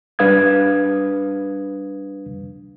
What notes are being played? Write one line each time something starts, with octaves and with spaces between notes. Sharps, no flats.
G3 D4 B4 F5 D#6 G#6